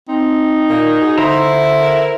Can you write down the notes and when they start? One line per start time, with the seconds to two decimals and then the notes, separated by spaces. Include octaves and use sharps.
0.08 C4 D#4
0.69 A#2 A#3
1.01 F#4 G#4
1.18 D3 E4 C5 E5 A#5
1.80 A#4